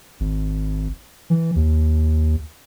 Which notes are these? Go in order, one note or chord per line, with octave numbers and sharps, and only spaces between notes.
G#1
E3
D#2